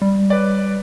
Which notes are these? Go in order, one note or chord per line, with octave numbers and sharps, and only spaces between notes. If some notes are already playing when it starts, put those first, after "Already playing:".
G3
B4 C#5 D5